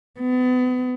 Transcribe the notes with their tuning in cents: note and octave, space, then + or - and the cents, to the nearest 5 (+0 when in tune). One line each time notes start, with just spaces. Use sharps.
B3 +35